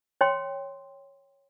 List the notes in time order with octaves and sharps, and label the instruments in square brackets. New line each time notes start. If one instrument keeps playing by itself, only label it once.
[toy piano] C#5 G5 C6